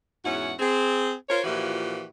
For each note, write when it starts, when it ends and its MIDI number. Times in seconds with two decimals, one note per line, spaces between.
0.24 0.53 40
0.24 0.53 44
0.24 0.53 61
0.24 0.53 64
0.24 0.53 66
0.24 0.53 78
0.59 1.13 60
0.59 1.13 68
1.29 1.40 65
1.29 1.40 70
1.29 1.40 72
1.29 1.40 73
1.44 2.04 46
1.44 2.04 52
1.44 2.04 53
1.44 2.04 64
1.44 2.04 66
1.44 2.04 67